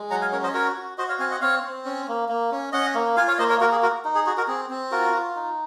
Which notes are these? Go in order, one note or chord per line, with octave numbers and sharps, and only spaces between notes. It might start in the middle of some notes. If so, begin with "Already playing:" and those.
Already playing: G#3
F#3 F#5 A#5
F5 G#5
C#4 A#4 C#5
C5 D#5
F#4 A#4 C#5
F#4
F#4 C5 D#5
C#5 F5
C4 F5 G#5
D#5 F#5
C4 C#5 F5
C4
C#4
A#3
A#3
C#4
C#4 D#5 F#5
A#3
F4 F5 G#5
C#5 F5
A#3 C5 D#5
A#4 C#5
A#3 F#4 A#4
G#4
F#4 A#4
D#4
G#4
F#4 G#4
F#4 A#4
C4 G#4
C4
F4 F#4 A#4
F4
D#4